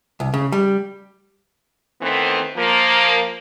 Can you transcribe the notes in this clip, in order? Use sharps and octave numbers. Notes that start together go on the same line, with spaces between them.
C2
C#3
G3
D#3 E3 A3 B3 C4
F3 A#3